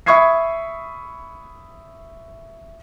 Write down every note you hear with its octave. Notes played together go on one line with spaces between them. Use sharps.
E5 B5 C#6 D#6 G#6 C7